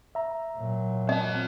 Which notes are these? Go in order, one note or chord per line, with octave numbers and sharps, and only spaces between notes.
E5 A#5
A#2 F#3
C4 D#5 A5